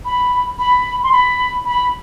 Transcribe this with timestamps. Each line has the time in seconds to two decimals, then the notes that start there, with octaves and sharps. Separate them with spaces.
0.05 B5
0.59 B5
1.03 C6
1.12 B5
1.65 B5